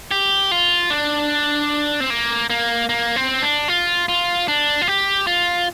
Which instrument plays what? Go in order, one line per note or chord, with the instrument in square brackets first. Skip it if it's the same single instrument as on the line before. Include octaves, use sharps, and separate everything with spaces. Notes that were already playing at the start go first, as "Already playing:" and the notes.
[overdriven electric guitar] G4
F4
D4
C4
A#3
A#3
A#3
C4
D4
F4
F4
D4
F4
G4
F4